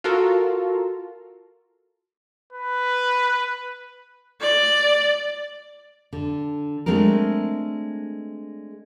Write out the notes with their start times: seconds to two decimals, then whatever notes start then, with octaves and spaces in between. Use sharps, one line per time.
0.04 F4 F#4 A4 A#4
2.53 B4
4.40 D5
6.13 D3
6.86 G#3 A3 C4 D4 A#4